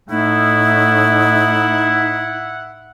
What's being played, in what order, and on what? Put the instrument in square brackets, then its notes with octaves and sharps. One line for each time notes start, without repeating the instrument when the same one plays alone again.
[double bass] A2 A3 [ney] D#4 [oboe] E4 [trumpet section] E5 F#5